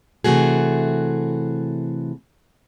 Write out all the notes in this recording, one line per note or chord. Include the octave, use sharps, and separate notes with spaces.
C3 E3 A3 F#4 G#4